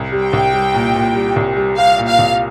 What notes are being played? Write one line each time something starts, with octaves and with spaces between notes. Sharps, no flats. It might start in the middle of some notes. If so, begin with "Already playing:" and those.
Already playing: C2
G3
G5
C2
G3
A#2
A#2
G3
C2
G3
G3 F5
A#2
F5
C2